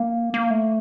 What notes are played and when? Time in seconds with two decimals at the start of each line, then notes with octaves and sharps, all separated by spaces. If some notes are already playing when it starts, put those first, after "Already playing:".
Already playing: A#3
0.34 A#3
0.50 A3